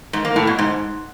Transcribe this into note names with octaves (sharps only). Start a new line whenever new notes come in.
G#2
A#3
A2
B2
G#2